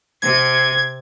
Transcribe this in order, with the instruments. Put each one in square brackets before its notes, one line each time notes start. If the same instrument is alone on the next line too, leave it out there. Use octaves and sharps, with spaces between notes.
[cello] C3 [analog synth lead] G#6